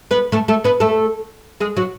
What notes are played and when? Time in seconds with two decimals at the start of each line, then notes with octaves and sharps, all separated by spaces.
0.11 B3 B4
0.32 A3 A4
0.48 A3 A4
0.64 B3 B4
0.80 A3 A4
1.60 G#3 G#4
1.77 F#3 F#4